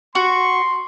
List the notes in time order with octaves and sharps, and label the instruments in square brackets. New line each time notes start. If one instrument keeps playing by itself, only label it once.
[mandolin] F#4 [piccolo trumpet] C6 [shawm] C#6